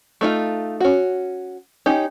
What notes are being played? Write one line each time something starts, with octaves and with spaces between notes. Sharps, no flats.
A3 D#4 F4
C#4 F#4
C#4 D#4 G4